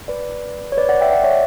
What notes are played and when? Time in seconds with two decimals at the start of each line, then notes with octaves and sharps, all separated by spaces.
0.08 B4 D5
0.72 C#5
0.77 B4 D5
0.89 D5 F#5
1.01 E5 G5
1.13 D5 F#5
1.24 C#5 E5